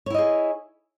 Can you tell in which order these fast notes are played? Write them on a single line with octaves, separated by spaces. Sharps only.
C#5 E4 D#5 G#4